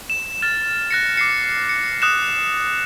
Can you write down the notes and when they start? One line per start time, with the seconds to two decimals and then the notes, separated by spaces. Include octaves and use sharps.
0.10 E7
0.42 F6 A6 E7
0.91 F#6 A#6 C#7
1.17 D6 C7 C#7
1.69 C#7
2.02 D#6 F#6 E7